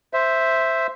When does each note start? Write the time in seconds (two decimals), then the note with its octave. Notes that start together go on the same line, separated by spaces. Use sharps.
0.13 C5 E5